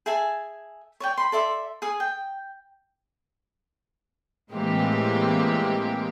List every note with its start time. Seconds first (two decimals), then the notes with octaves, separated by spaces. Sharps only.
0.06 G#4 E5 G#5 A5
1.00 C#5 D5 G5
1.17 B5 C6
1.32 A4 D5 E5 C6
1.82 G#4 G#5 D#6
2.00 G5
4.52 A2 E3 G#3 A#3 C4 G4